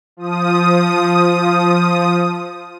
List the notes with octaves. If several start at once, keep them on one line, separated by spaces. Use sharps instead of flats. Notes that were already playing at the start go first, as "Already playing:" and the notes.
F3 D#6